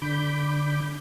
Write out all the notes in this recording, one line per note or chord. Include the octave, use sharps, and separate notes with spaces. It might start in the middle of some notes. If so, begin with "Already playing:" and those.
D3 B5 D6 G6